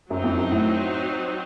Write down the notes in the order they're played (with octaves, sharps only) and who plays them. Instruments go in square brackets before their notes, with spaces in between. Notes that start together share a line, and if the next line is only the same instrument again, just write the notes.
[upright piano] F#2 [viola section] F#3 C4 D#4
[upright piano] F2
F#2
A2